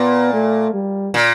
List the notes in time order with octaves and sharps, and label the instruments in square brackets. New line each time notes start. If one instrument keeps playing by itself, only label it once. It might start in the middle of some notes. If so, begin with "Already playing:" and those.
Already playing: [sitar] A#2 [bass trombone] B3
[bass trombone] A3
G3
[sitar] A#2